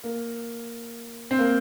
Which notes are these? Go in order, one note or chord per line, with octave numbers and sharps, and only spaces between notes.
A#3
C4
A#3